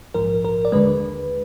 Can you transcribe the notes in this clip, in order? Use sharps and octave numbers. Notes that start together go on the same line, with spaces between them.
A#1 G#2 F3 A#4
A#4
D5
D#2 D3 G#3 B4